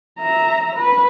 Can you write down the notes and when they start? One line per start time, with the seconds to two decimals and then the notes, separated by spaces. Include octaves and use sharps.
0.20 E5 A#5
0.76 B4